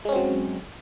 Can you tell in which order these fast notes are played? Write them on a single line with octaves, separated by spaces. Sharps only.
G#3 C#4 C4 F#3